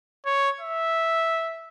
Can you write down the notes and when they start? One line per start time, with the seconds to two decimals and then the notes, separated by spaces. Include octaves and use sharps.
0.26 C#5
0.61 E5